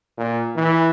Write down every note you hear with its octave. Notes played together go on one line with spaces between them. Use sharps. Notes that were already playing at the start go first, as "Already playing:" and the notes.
A#2
E3